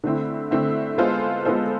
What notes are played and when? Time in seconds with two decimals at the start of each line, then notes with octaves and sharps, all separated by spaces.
0.04 D3 A3 C4 E4
0.51 D3 A3 C4 E4
0.98 G#3 B3 F4 A4 C5
1.45 G#3 B3 F4 A4 C5